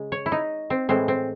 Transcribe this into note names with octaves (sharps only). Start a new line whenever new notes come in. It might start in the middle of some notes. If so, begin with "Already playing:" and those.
Already playing: C#3 G#3
C#5
E4
D#4
C4
A2 E3 G#3 C4
C4